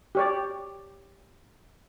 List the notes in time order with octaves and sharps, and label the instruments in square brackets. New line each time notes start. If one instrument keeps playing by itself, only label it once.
[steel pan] G4 C#5 D5